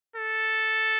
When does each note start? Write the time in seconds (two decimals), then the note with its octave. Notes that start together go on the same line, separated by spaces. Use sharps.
0.16 A4